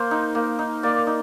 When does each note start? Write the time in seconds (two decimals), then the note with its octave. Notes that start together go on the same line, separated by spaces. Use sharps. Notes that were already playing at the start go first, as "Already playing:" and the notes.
Already playing: A#3 C5
0.11 D#4
0.35 A#3
0.59 D#4
0.83 A#3 D5
1.07 D#4